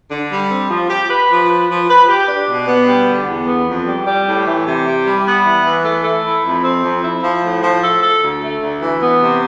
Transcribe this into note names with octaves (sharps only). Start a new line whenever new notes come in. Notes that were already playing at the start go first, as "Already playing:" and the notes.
D3
G3
C4
F3
G4
B4
F3
B4
F3
B4
G4
D4
B2
B3
G3
D3
E2
B3
F2
G3
G3
A2
E3
C3
G4
G3
B3
E3
E3
A3
A3
E4
F2
C4
F2
E4
F3
A2
F3
A4
A4
D2
A3
D2
E3
B3
C3